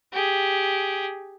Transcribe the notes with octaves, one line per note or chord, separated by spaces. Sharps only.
G4 G#4